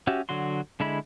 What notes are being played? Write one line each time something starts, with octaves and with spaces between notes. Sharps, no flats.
C#4 F#4 G4 E5
D3 F#3 F#4 C6
D3 G#3 E4 B5